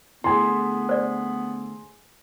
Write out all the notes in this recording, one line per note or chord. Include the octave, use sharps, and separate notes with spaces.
D3 A3 B3 E4 G#4 G#5 C6
C5 D5